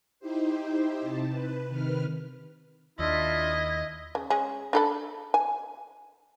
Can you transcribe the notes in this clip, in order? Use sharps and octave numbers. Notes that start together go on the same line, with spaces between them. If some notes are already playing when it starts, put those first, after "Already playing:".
D#4 E4 G4 C5
C3 A5
B4
C3 D#3 B4 F6
D#2 D4 E4 F4 D#5 E5
C#3
G#3 C#4 G#4
D4 A4 B5
G#5